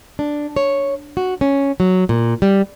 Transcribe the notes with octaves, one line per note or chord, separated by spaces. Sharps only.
D4
C#5
F#4
C#4
F#3
A#2
G3